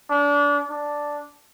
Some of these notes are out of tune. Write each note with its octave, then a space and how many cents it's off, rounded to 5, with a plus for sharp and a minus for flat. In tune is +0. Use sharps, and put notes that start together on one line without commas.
D4 -30
D4 +0